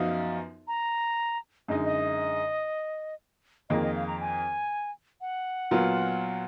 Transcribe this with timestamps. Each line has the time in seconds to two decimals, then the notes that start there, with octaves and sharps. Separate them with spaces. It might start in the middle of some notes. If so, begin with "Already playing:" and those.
Already playing: F#2 F3 B3 D#4 F#4 F5
0.68 A#5
1.68 F#2 D3 G#3 D#4 D#5
1.84 D#5
3.70 F2 D#3 A#3 F4 G#4 D#5
3.82 D#5
3.95 F5
4.07 A#5
4.21 G#5
5.21 F#5
5.71 A#2 F#3 B3 F4